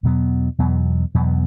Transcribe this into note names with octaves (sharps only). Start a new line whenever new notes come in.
E2 B2 F#3 B3
E2 B2 F#3 B3
E2 B2 F#3 B3